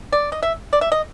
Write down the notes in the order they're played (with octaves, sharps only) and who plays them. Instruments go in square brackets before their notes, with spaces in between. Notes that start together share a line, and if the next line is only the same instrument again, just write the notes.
[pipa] D5
D#5
E5
D5
E5
D#5